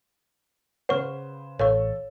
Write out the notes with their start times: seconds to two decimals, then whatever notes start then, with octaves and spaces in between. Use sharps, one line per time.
0.89 C#3 B4 C5 F#5 C#6 F6
1.59 A1 A4 C#5 F5 C#6